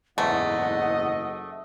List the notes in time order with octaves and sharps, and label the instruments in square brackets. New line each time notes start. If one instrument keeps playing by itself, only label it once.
[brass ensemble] F#1 D#5 [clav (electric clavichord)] E2 G#2 [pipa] A3 [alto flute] F#5